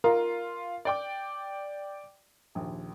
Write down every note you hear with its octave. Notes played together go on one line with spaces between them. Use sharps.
F4 A#4
D5 G5 D6
A#1 D#2